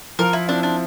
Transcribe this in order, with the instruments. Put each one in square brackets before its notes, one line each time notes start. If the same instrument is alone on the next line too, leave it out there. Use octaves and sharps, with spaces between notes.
[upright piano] F3 [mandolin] A#4
[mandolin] E4
[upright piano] C4 E4 [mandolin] D4
[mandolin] D4